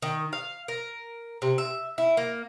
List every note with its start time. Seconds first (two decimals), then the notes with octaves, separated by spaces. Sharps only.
0.02 D#3
0.33 F5
0.68 A#4
1.42 C3
1.58 E5
1.98 E4
2.17 A#3